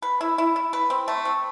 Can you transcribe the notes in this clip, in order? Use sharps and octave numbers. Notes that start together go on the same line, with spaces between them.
B4
E4
E4
E4
B4
C4
A3
C4